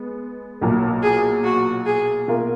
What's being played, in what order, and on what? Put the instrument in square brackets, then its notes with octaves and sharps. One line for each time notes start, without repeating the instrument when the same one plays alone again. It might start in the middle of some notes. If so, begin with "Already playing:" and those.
Already playing: [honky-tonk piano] G#3 B3
B1 A#2 F#3
[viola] G#4
F#4
G#4
[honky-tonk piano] B2 A#3 F4 A#4